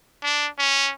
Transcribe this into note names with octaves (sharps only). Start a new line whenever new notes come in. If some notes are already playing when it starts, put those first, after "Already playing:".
D4
C#4